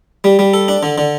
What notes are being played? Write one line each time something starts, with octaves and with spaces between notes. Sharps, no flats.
G3
G3
A4
D4
D3
D3